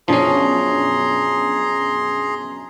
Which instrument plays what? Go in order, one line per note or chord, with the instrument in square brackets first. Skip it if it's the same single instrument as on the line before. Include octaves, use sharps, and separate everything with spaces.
[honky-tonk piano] F#2 B2 D4 [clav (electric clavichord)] F3 C#4 [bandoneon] G#4 A#5 C6